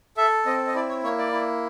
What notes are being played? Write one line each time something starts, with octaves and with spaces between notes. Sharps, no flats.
A4 E5
C4 D#5
D#5
E4 D5
C#5
A#3 C#5
D5
E4